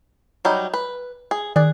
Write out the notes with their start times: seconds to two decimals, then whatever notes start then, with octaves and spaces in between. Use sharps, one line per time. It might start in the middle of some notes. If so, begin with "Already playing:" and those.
0.45 F#3 G3 D#4
0.74 B4
1.31 G#4
1.56 D#3 G#4 D5 F#6